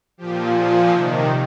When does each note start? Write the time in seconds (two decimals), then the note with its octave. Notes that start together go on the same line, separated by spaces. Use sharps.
0.17 A#2 F3 G4
0.53 A#2 F3 G#4
0.90 C3 D#3